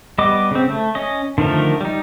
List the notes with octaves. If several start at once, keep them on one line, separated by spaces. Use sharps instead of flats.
G3 B3 D#5 D6
C#3 C4
A3
C#4 D#5
D3 D#3 F3 A3 A#4
G3 D#4